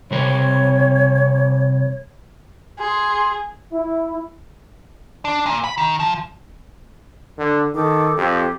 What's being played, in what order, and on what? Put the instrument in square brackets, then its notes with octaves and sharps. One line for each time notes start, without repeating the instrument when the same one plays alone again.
[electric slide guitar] C3 G3 A#4 [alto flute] C#5
[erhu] G#4 [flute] C6
[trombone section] E4
[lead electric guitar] D4
A#2
B5
D#3
F3
[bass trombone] D3
[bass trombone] D#3 [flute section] D#4 A4 D6
[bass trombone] F2 [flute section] G4